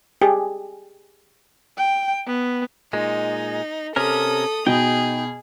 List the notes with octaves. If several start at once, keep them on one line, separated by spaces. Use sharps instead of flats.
G4 G#4
G5
B3
A#2 G#3 D#4
C3 C#4 A4 A#4 D#6
B2 D#4 G#4 G5